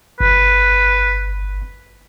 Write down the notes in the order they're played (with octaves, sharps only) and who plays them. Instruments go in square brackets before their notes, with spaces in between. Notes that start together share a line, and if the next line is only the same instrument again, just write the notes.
[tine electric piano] G1 [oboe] B4